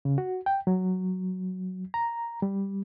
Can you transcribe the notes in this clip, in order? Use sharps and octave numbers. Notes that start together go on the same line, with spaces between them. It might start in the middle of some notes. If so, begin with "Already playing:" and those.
C#3
F#4
G5
F#3
A#5
G3